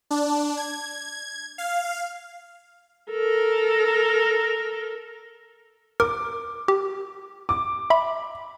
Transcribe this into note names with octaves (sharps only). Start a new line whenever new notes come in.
D4
G#6
F5
A4 A#4
A#4 D6
G4
D6
E5 B5 C6